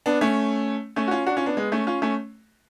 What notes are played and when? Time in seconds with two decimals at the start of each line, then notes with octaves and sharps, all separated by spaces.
0.06 B3 D4
0.21 A3 C#4
0.96 A3 C#4
1.08 F#4
1.11 C#4 F4
1.26 D4 F#4
1.37 C#4 F4
1.46 B3 D4
1.57 G#3 B3
1.72 A3 C#4
1.87 C#4 F4
2.02 A3 C#4